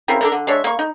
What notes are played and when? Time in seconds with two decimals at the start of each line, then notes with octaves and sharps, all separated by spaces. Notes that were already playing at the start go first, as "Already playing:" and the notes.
0.08 C#3 C4 E4 A#4
0.21 D4 A4 A#4
0.32 D3
0.47 G#3 D4 C#5 E5
0.64 A#3 C#6
0.79 D#4